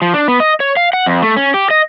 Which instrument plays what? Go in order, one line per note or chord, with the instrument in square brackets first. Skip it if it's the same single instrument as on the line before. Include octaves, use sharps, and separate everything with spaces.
[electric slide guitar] F3
D4
B3
D#5
C#5
F5
F#5
F2
A3
C#4
G4
D#5